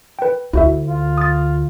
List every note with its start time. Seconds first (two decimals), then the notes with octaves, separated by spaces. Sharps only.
0.19 B4 G5
0.53 D2 E4 F#4 E5
0.88 F4
1.18 D#6 A6